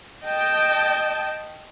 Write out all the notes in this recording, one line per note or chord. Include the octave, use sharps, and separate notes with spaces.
D#5 G5 A5